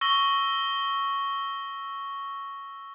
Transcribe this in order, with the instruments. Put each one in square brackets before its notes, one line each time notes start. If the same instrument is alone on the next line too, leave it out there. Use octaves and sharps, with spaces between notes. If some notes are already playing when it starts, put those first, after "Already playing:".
[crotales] C#6 E6 A#6 G7